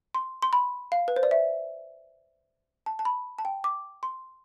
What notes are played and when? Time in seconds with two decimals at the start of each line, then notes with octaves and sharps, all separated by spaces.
0.15 C6
0.42 C6
0.53 B5
0.92 F5
1.08 B4
1.16 C5
1.23 D5
1.31 E5
2.86 A5
2.99 A5
3.05 B5
3.39 A5
3.45 G5
3.64 D6
4.03 C6